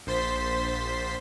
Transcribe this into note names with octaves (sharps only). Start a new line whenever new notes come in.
A#1 C5 C6 A6 B6